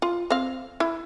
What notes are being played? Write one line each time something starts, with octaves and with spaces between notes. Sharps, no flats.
F4
C4 F5
E4